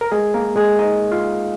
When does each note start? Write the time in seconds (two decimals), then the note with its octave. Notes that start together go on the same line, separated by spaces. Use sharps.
0.01 A#4
0.12 G#3 G#4
0.34 A#3 A#4
0.56 G#3 G#4
0.79 D#4 D#5
1.12 F4 F5